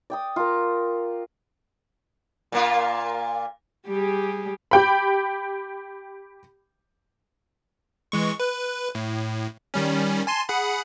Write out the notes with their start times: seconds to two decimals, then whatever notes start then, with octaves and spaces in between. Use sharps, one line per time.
0.10 D5 G5 D#6
0.36 F4 A#4
2.52 A#2 A#3 F4
3.86 G3 G4 G#4
4.71 G4 G5 B5
8.12 E3 G#3 C#6
8.40 B4
8.95 A2
9.74 D#3 G3 C#4
10.27 G#5 A5 C6
10.49 G#4 F#5 B5